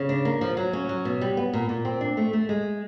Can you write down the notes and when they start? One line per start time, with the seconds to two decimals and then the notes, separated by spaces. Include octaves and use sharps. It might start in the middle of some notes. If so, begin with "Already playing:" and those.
Already playing: C#3
0.09 D4
0.25 A#3
0.41 F3
0.57 F#3
0.73 C#4
0.89 F#3
1.05 B2
1.21 G3
1.37 B3
1.53 A#2
1.69 A#2
1.85 C4
2.01 D4
2.17 A3
2.33 A3
2.49 G#3